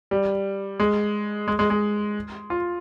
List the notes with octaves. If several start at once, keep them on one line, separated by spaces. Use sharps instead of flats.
G3
G#3
G#3
G#3
G#3
F4